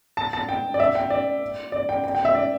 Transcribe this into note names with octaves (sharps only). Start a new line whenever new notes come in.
A5
A5
G5
D5
E5
G5
D5
D5
G5
G5
G5
E5
D5